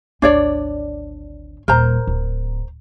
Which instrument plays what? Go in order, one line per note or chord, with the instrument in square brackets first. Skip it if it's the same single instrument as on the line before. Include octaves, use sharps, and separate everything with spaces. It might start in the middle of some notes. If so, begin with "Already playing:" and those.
[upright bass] G#1 D2 [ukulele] D4 C#5 D5
[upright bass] D#1 [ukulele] A#4 C5 A#5
[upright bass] D1